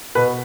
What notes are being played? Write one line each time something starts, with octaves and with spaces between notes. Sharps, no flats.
B2 B4